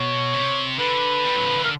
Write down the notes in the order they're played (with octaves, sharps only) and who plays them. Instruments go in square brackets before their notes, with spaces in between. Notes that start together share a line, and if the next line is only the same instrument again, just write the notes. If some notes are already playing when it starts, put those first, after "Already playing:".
Already playing: [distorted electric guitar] B2 [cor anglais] C#5
[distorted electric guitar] C3
[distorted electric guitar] D3 [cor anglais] B4
[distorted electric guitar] G3
F#3
F3
E3
[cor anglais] A#4